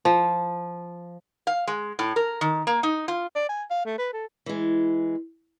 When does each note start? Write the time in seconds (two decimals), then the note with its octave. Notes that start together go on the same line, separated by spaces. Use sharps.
0.05 F3
1.47 F5
1.67 G#3
1.99 A2
2.16 A#4
2.41 D#3
2.67 A#3
2.83 D#4
3.08 F4
3.36 D5
3.49 G#5
3.70 F5
3.85 A3
3.98 B4
4.13 A4
4.46 E3 G#3